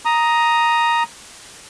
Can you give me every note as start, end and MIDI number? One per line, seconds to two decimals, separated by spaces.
0.05 1.03 82
0.05 1.03 87